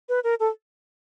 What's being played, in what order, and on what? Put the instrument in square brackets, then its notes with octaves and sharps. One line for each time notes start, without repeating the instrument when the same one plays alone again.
[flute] B4
A#4
A4